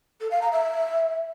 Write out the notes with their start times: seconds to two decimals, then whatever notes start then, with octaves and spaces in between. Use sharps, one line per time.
0.20 A4
0.31 F5
0.41 A#5
0.52 E5